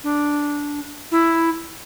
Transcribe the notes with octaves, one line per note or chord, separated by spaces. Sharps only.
D4
E4